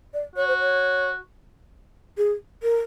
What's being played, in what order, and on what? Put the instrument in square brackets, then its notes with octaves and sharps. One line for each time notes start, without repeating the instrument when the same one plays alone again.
[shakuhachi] D5
[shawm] F#4 [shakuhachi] C#5
[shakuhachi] C5
C#5
G#4
A#4